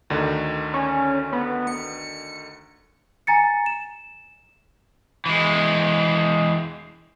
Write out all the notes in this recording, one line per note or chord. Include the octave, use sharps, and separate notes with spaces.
D2 D3 D#3
C#4
B3
C#7
G#5 A#5 A6 C#7
E7
E3 G#3